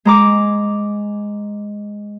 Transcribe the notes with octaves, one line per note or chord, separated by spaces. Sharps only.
G#3 A#5 D6